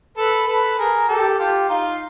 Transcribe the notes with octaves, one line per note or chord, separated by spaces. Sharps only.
A4 B4
A4 B4
G#4 A#4
G4 A4
F4 G4
D#4 F4